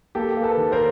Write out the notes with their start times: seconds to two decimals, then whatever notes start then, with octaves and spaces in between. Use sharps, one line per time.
0.15 A#3 G4 A4
0.37 A#3
0.43 A4 B4
0.57 D#3
0.72 A#4 C5